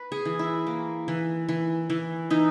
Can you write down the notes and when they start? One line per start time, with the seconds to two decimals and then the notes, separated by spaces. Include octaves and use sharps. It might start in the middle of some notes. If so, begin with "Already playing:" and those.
Already playing: B4
0.12 G#4
0.25 E3
0.39 E4
0.67 A#3
1.08 E3
1.49 E3
1.90 E3
2.30 E3 D#4